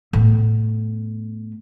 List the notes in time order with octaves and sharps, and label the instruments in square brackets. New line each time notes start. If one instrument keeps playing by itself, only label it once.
[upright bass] A2 B3